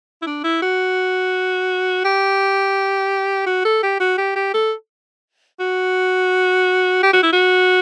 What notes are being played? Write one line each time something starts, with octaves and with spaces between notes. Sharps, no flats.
E4
D4
E4
F#4
G4
F#4
A4
G4
F#4
G4
G4
A4
F#4
G4
F#4
E4
F#4